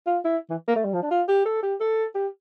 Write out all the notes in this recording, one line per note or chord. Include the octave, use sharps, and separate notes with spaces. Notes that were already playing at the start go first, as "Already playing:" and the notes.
F4
E4
E3
A#3
A3
G3
F3
D4
F4
G4
A4
G4
A4
G4